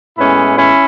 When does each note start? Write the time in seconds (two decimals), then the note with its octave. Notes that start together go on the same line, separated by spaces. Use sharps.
0.17 A2 G#3 B3 C#4 E4
0.57 C#4 E4